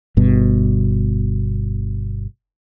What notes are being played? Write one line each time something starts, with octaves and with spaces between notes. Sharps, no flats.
G1 G2 B2